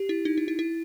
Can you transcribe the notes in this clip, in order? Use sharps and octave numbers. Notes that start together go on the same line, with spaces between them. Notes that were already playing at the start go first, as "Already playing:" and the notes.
Already playing: G4
E4
D#4
E4
E4
E4